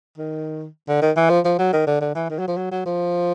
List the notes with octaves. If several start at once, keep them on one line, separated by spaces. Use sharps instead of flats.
D#3
D3
D#3
E3
F3
F3
F#3
D#3
D3
D3
E3
D#3
F#3
F3
F#3
F#3
F3